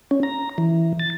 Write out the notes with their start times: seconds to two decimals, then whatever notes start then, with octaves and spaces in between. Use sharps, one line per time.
0.11 C#4
0.23 A#5
0.58 E3
1.00 A6